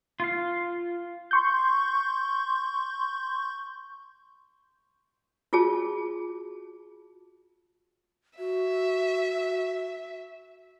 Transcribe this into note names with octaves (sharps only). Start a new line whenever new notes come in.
F4 F5
C6 C#6 G6
F4 F#4 G#4 A5
F#4 E5